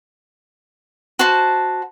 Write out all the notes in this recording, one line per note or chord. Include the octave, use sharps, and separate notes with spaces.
F#4 C5 A5